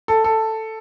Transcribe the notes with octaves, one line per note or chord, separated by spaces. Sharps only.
A4
A4